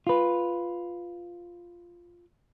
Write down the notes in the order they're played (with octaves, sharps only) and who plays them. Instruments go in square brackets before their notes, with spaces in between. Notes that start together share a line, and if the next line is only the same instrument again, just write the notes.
[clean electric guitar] F4 B4